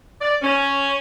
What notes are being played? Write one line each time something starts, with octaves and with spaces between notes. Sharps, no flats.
D5
C#4